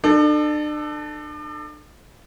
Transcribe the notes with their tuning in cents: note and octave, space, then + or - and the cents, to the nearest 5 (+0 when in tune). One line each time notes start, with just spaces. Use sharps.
D4 +40 A4 +0